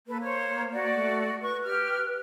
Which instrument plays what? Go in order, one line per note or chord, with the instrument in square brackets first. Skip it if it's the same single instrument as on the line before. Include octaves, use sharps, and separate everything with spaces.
[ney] A#3 [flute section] A4 B4
[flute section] C5 C#5
F#4 D5
[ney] A3
[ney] B4 [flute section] C#6
[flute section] G4 F6